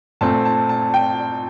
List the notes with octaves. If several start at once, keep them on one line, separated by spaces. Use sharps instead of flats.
A#2 A3 C4 A5
A5
A5
G5